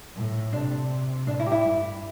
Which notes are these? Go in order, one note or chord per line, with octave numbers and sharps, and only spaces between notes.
A2
C3 D4
A2 D4
E4
G4
E4
G2